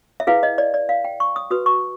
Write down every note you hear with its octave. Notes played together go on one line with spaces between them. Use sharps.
E5
E4 G#4 B4 F5
D#5
D5
D5
F5
G5
C#6
D#6
F#4 B4 D#6
C#6